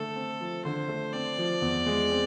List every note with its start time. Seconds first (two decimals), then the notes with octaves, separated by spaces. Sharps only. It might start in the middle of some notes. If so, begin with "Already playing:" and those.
Already playing: D3 A3 A4
0.15 C4
0.41 F3
0.65 D3 C5
0.88 A3
1.13 C4 D5
1.38 F3
1.62 E2
1.86 G#3
2.11 C4